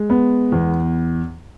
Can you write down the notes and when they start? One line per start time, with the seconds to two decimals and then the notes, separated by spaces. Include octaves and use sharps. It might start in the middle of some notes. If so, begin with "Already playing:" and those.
Already playing: G#3
0.10 B3
0.52 E2